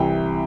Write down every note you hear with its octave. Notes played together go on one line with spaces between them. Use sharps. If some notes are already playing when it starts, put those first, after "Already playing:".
Already playing: C2 C3 E3 G5